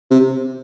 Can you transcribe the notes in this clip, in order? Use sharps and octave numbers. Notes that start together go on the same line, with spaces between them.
C3